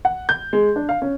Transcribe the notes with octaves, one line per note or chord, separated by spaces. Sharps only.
F#5
G6
G#3
D4
F5
C#4